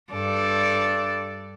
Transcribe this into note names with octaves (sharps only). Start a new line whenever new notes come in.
G2 A4 D5